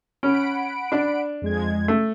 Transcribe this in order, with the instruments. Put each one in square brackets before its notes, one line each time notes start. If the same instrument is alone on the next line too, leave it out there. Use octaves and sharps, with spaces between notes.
[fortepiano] C#4 [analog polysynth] F#5 B5 D7
[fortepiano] D4 D5
[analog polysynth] F2 G#3 G#6
[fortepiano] A3